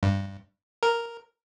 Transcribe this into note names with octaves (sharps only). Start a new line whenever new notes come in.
G2
A#4